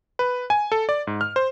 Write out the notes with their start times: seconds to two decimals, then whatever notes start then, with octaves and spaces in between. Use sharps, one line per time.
0.19 B4
0.50 G#5
0.72 A4
0.89 D5
1.07 G#2
1.21 F6
1.36 C5